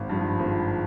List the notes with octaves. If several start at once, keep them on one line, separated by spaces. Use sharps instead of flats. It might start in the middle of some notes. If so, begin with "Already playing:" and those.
Already playing: G#1
G2 F3
G#1